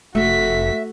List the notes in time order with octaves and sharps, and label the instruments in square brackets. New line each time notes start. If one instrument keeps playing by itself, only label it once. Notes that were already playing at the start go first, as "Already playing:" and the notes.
[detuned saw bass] F1 [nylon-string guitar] A3 [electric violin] F#4 B6 [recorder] E5